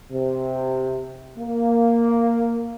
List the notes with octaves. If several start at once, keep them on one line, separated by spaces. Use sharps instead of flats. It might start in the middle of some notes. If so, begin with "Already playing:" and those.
C3
A#3